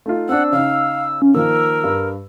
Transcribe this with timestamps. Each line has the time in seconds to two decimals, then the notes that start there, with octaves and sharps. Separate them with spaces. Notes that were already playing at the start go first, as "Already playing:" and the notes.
0.06 A3 D#4 F4
0.29 C4 D4 F#5 E6
0.52 C#3 D#4 F5
1.22 C#4
1.35 D#3 F3 A#3 A#4 E6
1.84 G2